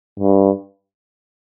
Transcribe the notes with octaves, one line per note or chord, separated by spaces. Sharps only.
G2